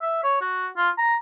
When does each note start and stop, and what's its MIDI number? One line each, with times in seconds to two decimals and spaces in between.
0.02 0.22 76
0.24 0.37 73
0.41 0.68 66
0.77 0.90 65
0.98 1.15 82